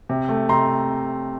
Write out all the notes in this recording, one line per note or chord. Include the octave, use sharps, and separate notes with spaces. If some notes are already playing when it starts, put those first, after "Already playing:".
C3
A3
C3 A#5 C6